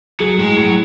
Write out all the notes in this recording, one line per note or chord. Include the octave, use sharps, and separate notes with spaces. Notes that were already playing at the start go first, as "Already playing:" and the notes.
F#3 G#4
A2 G#3
A2 F#3